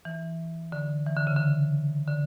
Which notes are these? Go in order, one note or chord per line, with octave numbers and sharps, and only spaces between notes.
E3
D3
E3
D3
C#3
D3
D3